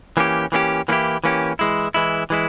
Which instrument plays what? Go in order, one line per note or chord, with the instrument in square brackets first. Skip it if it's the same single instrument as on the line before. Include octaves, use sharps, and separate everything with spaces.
[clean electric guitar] E3 A#3 C#4 E4 G4
E3 A#3 C#4 E4 G4
E3 A#3 C#4 E4 G4
E3 A#3 C#4 E4 G4
E3 G#3 E4
E3 G#3 E4
E3 G#3 E4